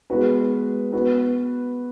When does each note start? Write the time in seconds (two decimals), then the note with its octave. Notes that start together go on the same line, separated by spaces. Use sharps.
0.10 G#3 B3 F#4 B4
0.92 B3 F#4 B4